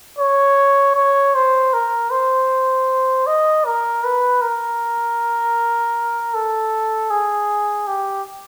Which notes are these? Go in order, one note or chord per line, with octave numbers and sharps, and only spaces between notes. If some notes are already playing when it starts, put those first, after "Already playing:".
C#5
C#5
C5
A#4
C5
D#5
A#4
B4
A#4
A4
G#4
G4